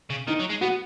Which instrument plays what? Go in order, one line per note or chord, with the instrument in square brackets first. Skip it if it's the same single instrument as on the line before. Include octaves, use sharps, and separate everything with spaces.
[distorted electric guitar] C#3
[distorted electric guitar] D#3 [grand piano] D#4
[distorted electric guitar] F#3
G#3
[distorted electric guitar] B3 [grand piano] F#4